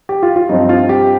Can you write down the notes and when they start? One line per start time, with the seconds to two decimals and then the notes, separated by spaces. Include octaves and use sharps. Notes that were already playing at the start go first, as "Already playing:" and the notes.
0.09 G4
0.23 F4
0.36 F4
0.49 G2 F3 C4 D#4
0.69 F4
0.89 G4